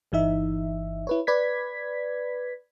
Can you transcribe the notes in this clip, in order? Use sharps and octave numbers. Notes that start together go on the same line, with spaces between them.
G1 E3 D#4 E5
E4 B4 C#5
B4 D5 G#6 B6